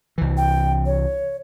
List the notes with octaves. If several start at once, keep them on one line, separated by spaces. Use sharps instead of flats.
C2 E3
G5
C#5